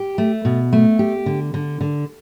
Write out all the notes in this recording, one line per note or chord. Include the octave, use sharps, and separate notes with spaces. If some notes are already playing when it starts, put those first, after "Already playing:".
Already playing: G4
A3
B2
A3
G4
D3
D3
D3